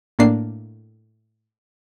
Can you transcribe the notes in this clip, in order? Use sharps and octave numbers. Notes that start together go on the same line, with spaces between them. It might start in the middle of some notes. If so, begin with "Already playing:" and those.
A2 A#3 D4 C7